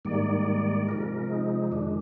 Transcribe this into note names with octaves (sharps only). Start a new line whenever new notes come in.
G#2 D#3 G3 A#3 D5
C3 F3 G#3 A#4
D#4
F2 D#3 G#3 D4